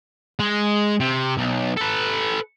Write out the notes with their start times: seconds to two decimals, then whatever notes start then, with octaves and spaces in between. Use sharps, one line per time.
0.40 G#3
1.00 C3
1.37 B1
1.77 A4 B4